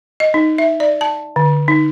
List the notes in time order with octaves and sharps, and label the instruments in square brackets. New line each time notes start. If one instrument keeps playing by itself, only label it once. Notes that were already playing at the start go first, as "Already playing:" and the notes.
[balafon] D#5
D#4
E5
D5
A5
D3
D#4